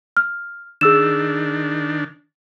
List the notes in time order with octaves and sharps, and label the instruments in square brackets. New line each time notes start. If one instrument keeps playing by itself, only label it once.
[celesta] F6
[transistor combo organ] D#3 D4 [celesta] G#4 E6 E7